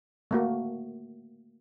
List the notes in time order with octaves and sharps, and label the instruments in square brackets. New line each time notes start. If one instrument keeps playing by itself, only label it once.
[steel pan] A3 A#3 F#4